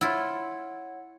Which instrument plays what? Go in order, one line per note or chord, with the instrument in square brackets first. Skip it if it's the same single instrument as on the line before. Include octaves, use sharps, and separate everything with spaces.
[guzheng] E4 F4 [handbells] C#5 F#5